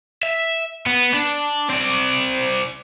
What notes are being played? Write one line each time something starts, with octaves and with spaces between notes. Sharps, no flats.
E5
B3
D4
C4 D5